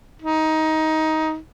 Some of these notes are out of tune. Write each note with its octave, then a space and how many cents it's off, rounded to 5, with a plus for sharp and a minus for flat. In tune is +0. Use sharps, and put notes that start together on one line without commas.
D#4 +15